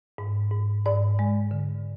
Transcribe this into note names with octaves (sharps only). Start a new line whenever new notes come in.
G#2
G#2
G#2 D5
G#3
D3